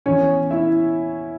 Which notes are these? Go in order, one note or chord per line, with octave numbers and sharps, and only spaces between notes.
E2 E3 C#4 C#5
E4 E5